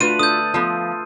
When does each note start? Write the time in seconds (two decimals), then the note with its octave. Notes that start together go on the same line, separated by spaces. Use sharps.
0.01 A3 D4 F4 F#4 B4 D#7
0.19 D4 A4 D#6 G6
0.54 F3 B3 F4 A4